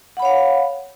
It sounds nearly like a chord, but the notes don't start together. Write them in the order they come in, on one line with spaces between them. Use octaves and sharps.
F#5 B5 C#5 F5